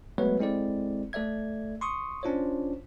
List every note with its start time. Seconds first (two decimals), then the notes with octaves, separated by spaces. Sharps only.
0.18 F#3 G#3 A3 B3 B4 C#5
0.39 G#3 C4 E4 A4 D5
1.13 A3 A4 D5 E5 G#6
1.81 C6 C#6 D#6
2.23 C#4 D4 F4 C5 C#5